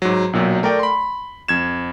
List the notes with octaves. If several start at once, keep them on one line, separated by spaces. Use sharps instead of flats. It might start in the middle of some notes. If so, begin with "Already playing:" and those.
G#2 F#3
B1 A#2 F#3
A3 A#4 D5 G5
B5 C6
F2 G#6 E7